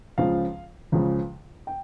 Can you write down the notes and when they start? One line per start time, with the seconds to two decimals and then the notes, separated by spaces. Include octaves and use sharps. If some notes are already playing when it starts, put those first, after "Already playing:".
0.18 C#2 C#3 F3 F5
0.92 C#2 C#3 F3
1.67 G5